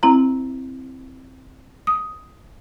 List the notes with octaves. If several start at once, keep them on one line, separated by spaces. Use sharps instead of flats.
C4 E4 A#5
D#6